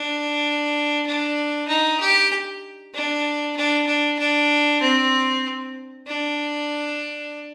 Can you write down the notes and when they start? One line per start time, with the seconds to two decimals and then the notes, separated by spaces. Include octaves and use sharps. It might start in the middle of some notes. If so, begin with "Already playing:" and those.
Already playing: D4
1.06 D4
1.68 D#4
2.00 G4
2.94 D4
3.56 D4
3.87 D4
4.19 D4
4.81 C4
6.07 D4